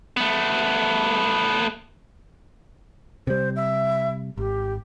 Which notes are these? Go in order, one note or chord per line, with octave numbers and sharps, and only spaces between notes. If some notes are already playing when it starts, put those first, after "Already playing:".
A3 B3
C3 G3 C5
E5
G#1 G4